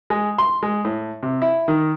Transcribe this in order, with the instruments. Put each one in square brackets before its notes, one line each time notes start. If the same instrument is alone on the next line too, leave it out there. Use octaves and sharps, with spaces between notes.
[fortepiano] G#3
C6
G#3
A2
C3
E4
D#3